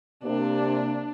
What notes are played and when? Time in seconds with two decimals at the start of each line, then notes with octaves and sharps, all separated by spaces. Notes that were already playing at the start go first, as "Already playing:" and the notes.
0.24 C3 A#3 D4